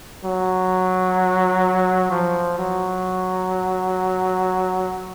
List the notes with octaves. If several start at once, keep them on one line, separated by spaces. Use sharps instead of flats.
F#3
F3
F#3